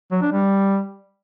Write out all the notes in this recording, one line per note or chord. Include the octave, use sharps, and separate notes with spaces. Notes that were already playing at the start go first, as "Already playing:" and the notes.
F#3
D4
G3